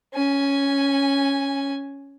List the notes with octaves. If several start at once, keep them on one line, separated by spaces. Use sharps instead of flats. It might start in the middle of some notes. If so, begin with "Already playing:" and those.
C#4 G#5